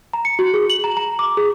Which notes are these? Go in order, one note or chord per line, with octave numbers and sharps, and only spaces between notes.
A#5
C#7
F#4
G#4
F#7
A#5
A#5
D6
G#4